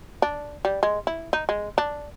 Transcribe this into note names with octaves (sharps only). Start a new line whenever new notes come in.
D4
G3
G#3
E4
D#4
G#3
D4